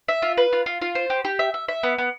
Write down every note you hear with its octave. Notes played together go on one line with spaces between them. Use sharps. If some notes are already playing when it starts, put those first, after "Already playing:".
E5
F4
B4
F4
F4
F4
C5
G4
G4
E5
E5
E5
B3
B3